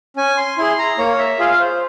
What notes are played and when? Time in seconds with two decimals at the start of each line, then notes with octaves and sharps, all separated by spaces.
0.16 C#4 G#5
0.37 C6
0.58 E4 G#4 C6
0.78 A#5
0.98 A#3 C#5
1.19 E5
1.39 F4 G#4 F5
1.60 C5